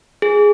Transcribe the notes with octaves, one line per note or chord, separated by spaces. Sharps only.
G#4